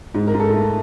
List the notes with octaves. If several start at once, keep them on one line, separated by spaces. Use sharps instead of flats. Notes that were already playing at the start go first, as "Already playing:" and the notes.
G#2
A#4
G#2
A4
A3